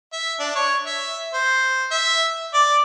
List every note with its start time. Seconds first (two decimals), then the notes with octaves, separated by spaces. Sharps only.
0.13 E5
0.39 D4
0.55 C#5
0.86 E5
1.34 C5
1.91 E5
2.54 D5